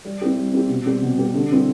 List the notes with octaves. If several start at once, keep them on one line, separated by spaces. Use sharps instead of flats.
G3
C4 E4 G4
G3
C4 E4 G4
B2
G3 C4 G4
B2
G3 C4 G4
D3
G3 C4 E4